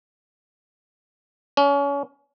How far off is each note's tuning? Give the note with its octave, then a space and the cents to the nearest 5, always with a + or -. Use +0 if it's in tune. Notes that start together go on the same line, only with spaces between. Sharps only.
C#4 +30